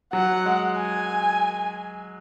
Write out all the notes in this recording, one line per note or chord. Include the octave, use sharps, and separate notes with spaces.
F#3 F#5
G#3
G#5